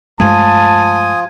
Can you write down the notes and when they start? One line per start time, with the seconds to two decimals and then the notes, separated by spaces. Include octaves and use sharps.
0.20 G2 F3 G#3 A3 F4 G#5 A5 D#6